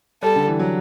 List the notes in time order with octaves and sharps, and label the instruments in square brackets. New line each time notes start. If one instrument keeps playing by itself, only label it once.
[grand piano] G3 [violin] A4
[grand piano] D3
E3
F#3